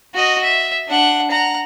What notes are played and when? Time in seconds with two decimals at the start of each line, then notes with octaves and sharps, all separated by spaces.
0.15 F#4 D#5
0.44 E5
0.88 D4 F#5
1.31 F#5 A#5